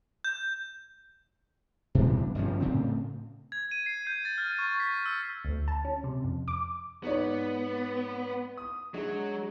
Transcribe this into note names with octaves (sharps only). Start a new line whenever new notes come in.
G6
B2 E3 G3 D4
G1 G2 F3 C#4
A2 C#3 C4
G#6
D#7
C7
G6
A6
F6
C#6
B6
E6
D2
A5
C#4
C3
F2
D6
G#2 B3 C#5 D5
D#6
F#3 G#3 D4